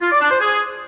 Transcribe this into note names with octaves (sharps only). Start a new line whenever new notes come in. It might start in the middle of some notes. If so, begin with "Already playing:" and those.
F4
D5
D4
C5
G#4